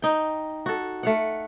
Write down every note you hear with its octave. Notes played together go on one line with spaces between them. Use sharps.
D#4 G5
F#4 A4
A3 F5 F#5